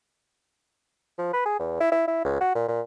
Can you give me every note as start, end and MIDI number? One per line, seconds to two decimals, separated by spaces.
1.19 1.29 53
1.33 1.41 71
1.46 1.59 68
1.59 1.77 40
1.80 1.91 64
1.92 2.04 64
2.08 2.24 64
2.25 2.37 37
2.40 2.54 66
2.55 2.67 46
2.68 2.81 46